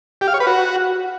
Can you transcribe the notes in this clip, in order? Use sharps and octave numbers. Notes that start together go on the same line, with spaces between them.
G4
F5
C#5
B4
F#4